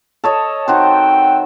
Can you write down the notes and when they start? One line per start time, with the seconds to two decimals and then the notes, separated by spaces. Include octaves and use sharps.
0.24 A4 C#5 D#5
0.68 D#3 C4 F#4 C5 G5